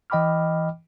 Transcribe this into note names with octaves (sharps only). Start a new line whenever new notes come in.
E3 D#5 G5 B5 D6 F6